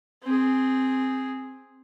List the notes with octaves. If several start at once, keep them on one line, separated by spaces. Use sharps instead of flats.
C4 G#4